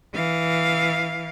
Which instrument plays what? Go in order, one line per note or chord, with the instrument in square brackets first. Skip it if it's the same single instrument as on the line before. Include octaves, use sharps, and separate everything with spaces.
[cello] E3 F5